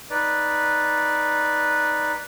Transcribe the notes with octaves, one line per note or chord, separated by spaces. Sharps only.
D#4 B4 D5